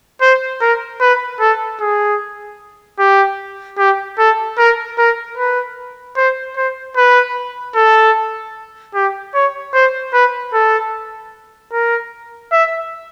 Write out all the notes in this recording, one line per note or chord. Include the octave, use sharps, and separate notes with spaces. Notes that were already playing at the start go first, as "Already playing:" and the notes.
C5
A#4
B4
A4
G#4
G4
G4
A4
A#4
A#4
B4
C5
C5
B4
A4
G4
C#5
C5
B4
A4
A#4
E5